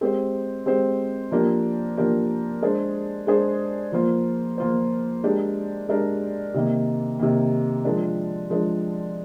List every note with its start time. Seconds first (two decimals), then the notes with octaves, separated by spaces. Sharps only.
0.01 G#3 C4 G4 C5
0.66 G#3 C4 G4 C5
1.31 F3 A#3 D4 G4 A#4
1.97 F3 A#3 D4 G4 A#4
2.62 G#3 D4 G#4 C5
3.27 G#3 D4 G#4 C5
3.92 F3 A#3 F4 C5
4.58 F3 A#3 F4 C5
5.24 G#3 D4 G4 A#4
5.89 G#3 D4 G4 A#4
6.54 C3 D#3 A#3
7.19 C3 D#3 A#3
7.85 F3 G#3 D4
8.50 F3 G#3 D4